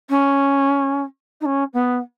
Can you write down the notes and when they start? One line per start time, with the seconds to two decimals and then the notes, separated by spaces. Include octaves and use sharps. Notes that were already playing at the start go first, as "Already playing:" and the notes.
0.09 C#4
1.41 D#4
1.45 C#4
1.73 B3